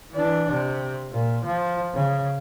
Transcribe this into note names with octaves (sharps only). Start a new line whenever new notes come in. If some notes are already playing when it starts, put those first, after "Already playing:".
E3 D4
C3
A#2
F3
C#3